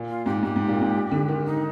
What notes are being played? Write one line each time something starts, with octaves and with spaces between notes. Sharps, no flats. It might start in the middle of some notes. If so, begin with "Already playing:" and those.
Already playing: A#2
F4
G#2 G4
G#2 G4
G#2
A#2
G#2
D3
D#3
D#4